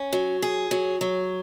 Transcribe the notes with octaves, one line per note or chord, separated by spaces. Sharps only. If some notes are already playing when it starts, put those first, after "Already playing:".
Already playing: C#4
F#3
G#4
F#3
F#3